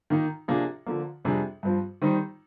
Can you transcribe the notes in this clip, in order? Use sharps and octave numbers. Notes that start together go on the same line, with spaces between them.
D#3 A#3 D#4
C3 F3 A#3 D4 G#4
D3 F3 A#3
F2 C3 G3 D4 G#4
G2 F3 C4
D#3 G3 C4 D#4